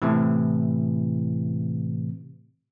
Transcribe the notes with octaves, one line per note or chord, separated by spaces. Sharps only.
A2 C3 E3